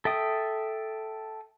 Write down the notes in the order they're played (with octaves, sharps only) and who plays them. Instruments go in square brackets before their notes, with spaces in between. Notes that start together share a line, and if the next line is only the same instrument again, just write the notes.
[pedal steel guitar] A4 E5 G5 D#6